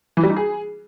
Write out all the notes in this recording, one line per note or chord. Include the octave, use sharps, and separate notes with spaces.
E3
G3
D#4
G#4